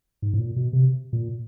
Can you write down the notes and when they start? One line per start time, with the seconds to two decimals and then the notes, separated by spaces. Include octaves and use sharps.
0.22 G#2
0.34 A2
0.39 A#2
0.56 B2
0.73 C3
1.13 A#2